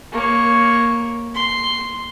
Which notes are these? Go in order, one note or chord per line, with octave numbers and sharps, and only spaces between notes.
A#3 C#5
C6